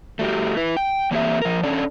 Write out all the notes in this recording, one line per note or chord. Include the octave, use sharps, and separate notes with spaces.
A3 F#4 G4
E4 B4
G5
E3 A#3 C4 G4 A4 E5
F3 A#4
C#4 D4 A4 D5